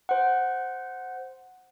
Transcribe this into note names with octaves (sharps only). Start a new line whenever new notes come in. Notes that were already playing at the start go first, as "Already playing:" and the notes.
C5 F#5